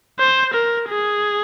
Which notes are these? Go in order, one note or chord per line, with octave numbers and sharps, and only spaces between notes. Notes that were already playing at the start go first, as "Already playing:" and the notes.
C5
A#4
G#4